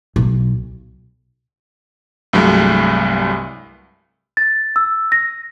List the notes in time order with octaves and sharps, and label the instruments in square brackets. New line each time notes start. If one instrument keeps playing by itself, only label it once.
[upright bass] B1
[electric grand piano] C2 G2 F#3 G#3 A3
[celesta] A6
E6
A#6